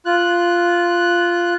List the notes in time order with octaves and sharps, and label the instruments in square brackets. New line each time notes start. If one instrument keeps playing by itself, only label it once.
[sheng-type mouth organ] F4 F#6